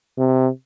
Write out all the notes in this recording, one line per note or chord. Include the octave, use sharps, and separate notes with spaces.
C3